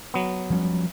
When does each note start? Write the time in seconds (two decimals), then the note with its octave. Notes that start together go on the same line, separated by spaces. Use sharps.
0.14 F#3 B3
0.50 F3 G3 C#4